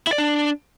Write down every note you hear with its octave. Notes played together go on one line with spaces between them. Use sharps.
E4
D5
D4